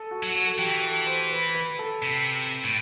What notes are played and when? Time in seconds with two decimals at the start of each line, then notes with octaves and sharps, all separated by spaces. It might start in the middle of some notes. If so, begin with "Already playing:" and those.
Already playing: A4
0.11 F#4
0.23 F#3
0.35 F#4
0.47 A4
0.58 E3 G4
0.83 A4
1.07 C5
1.31 B4
1.55 B4
1.79 A4
2.02 C3
2.64 A2